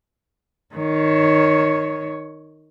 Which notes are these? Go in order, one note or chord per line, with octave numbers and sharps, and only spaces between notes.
D#3 C#5